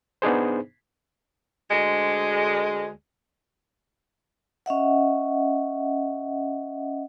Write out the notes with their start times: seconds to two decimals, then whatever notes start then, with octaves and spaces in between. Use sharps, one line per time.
0.22 B3 D4 D#4 G#4 C5
1.71 D2 G#3
4.66 C#4 D#5 E5 F#5